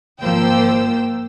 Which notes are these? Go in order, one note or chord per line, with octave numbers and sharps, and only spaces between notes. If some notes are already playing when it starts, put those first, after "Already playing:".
G#1 F3 A#3 C5 G5 E6